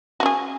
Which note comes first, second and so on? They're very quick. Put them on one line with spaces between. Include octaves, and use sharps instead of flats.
F#4 C#4 G#4